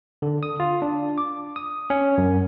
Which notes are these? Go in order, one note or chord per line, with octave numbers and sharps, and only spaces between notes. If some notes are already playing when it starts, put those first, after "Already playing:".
D3
D#6
F4
D4
D6
D#6
C#4
F#2